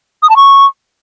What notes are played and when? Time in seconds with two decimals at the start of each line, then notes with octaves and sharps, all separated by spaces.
0.23 D#6
0.30 A5
0.36 C#6